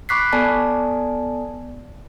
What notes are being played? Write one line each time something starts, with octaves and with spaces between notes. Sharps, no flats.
B5 C#6 D6 F#6 B6 C7
B3 A4 D5 G#5 A5